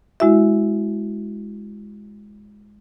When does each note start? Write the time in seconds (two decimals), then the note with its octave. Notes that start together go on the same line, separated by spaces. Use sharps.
0.20 G#3 E4 F#4 E5